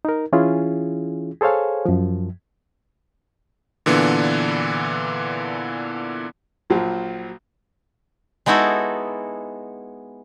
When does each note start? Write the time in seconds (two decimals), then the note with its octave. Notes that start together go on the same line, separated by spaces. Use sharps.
0.05 D#4 A#4
0.33 E3 C#4 E4 F4 G#4
1.41 G#4 A4 C5 C#5 F5 G#5
1.86 F#2 F3
3.86 A#2 D3 E3 B3 D4
6.70 A#1 F3 F#3
8.46 G#3 B3 D#4 E4 F#4 A4